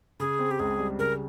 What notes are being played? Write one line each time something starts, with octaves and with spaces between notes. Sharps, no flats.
C#3 G#4
C4
G4
C#2 G#4
G3
C#3 A#4